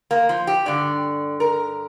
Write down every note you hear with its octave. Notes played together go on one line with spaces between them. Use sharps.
A#3
F3
G4
G2 D3 D5
A#4